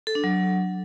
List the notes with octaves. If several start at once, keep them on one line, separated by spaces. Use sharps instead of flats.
A4
D4
F#3